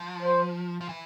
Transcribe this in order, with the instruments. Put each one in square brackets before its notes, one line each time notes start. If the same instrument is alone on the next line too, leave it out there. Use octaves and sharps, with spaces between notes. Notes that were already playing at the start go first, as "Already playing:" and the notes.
Already playing: [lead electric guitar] F3
[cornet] C5
[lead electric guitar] F3
E3